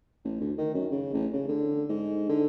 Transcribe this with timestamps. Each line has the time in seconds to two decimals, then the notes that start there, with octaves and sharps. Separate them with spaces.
0.25 A1
0.40 D2
0.58 D#3
0.74 F#2
0.91 C#3
1.13 A1
1.33 C#3
1.48 D3
1.89 G#2
2.29 D3